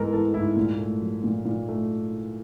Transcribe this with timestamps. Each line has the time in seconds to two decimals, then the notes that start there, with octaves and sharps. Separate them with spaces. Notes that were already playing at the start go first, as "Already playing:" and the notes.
Already playing: G#2 E3 G#3 B3 A4 A#4
0.13 E3 A4
0.34 G#2 E4
0.57 A#2
0.79 A3
1.01 F#3
1.24 A#2
1.45 A#2
1.69 A3